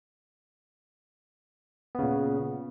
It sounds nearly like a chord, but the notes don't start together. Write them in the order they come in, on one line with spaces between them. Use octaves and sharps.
B3 C#3 A#2